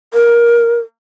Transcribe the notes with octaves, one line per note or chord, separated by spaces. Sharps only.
A#4